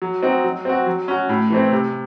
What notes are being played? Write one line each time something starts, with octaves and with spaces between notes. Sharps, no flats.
F#3
C4 D#4 F#4
F#3
C4 F#4
F#3
C#4 F#4
A2
E3 A3 C4
C3